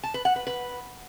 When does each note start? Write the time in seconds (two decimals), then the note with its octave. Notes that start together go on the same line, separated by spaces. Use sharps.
0.03 A5
0.14 B4
0.25 F#5
0.36 B4
0.47 B4